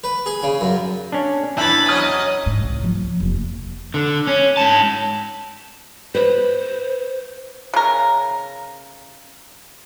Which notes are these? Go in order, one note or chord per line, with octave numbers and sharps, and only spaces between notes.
B4
G#4
C#3
F#2
C#4 D4
E2 E3 D4 E5 B5 A6
F#3 C#4 D#5 D#6 F6 G#6
G#2
C2
F3 F#3
F1 D#2
D3
C#4
G#2 A5
B4 C5
C#3 A#4